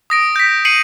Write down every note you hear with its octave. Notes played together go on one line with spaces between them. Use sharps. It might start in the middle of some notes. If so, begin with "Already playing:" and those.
D#6 A#6 D7
G6 B6
C7 C#7 D#7 F#7